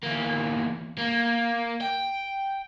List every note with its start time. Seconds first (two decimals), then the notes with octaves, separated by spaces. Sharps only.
0.03 E2 A#3
0.98 A#3
1.81 G5